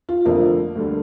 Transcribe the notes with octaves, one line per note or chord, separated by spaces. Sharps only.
F4
F1 F2 D3 F3 A#3
D2 D3 G3